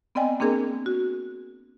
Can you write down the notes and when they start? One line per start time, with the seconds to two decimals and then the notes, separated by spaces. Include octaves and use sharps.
0.15 B3 C4 D5 D#5 G5 G#5
0.40 A#3 C4 D4 G#4 A#4
0.86 F#4